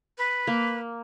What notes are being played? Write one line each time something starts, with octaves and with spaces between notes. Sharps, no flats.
B4
A#3